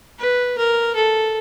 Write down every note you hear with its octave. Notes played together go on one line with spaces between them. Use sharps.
B4
A#4
A4